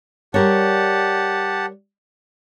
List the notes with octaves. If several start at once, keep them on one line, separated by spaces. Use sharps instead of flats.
G3 G4 A#4 C#5 F#5 A5